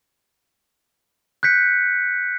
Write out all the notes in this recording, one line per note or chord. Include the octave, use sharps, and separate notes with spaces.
F#6 G6 B6 C#7